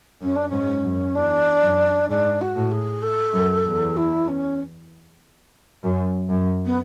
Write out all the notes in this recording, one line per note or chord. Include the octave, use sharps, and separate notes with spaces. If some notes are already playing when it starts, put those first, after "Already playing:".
F#2 C#4
D4
G#2 C#4
F#2
E2 D4
F#2
G#2 D4
F#4
A2
G#4
A4
F#2
E2
E4
C#4
F#2
F#2
B3